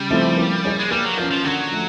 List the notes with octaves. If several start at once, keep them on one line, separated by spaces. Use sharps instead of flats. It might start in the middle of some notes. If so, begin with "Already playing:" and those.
Already playing: C#3 G3
F3 A3 C4 E4
A#3
D#4 G#4 C#5
G#3
G3 A#3
F#3
F3 C#4 F4 A#4
F3
D3 F#3
F3 A3